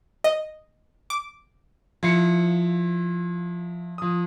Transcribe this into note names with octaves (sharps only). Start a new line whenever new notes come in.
D#5
D6
F3 E4 C7 C#7
F3 D#6